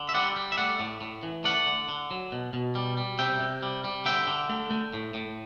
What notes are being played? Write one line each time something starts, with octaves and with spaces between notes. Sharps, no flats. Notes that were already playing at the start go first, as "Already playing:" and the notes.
Already playing: D3
E5
G3 D5 F#5
G3
E5
A3 D5 F#5
A2
A2
E3
A3 D5 F#5
D3
D3
F#3
B2
B2
G3
G3
C3 E5 G5
C3
G3
G3
D3 E5 G5
D3
A3
A3
A2
A2